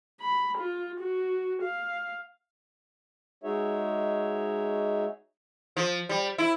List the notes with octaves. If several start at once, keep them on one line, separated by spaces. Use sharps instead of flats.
B5
F4
F#4
F5
G#3 D#4 F#4 G#4 C#5 E5
F3
G3
E4